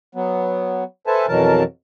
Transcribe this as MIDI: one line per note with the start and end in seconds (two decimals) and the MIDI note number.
0.15 0.84 54
0.15 0.84 59
1.07 1.26 69
1.07 1.26 71
1.07 1.26 72
1.07 1.26 76
1.07 1.26 80
1.07 1.26 81
1.28 1.63 41
1.28 1.63 47
1.28 1.63 52
1.28 1.63 54
1.28 1.63 70
1.28 1.63 81